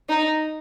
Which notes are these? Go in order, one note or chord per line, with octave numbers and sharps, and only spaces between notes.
D#4